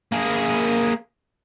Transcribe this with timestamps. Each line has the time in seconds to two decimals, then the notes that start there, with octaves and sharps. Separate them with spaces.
0.12 A#3 G#4